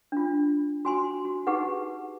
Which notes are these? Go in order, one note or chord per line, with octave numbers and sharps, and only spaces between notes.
D4 F4
F#4 G#5 C6
F#4
D#4 G4 G#4 B4 F#5